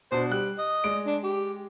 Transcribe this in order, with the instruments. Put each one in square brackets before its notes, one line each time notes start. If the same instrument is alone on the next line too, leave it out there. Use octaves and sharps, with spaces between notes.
[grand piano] B2 D4 [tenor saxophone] C5
[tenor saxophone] G3 [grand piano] F#6
[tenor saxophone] D#5
[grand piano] G#3 D5 D7
[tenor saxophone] D4
G4